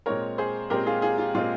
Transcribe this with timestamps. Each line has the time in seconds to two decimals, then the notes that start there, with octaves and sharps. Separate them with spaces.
0.06 A#2 G#3 C4 A#4 C#5
0.38 G#4 C5
0.70 A#2 G#3 C4 G4 A#4
0.86 F4 G#4
1.02 F4 G#4
1.18 F4
1.35 A#2 G#3 C4 F4